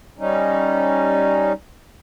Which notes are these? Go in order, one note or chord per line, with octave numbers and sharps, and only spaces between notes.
G3 C#4 D#4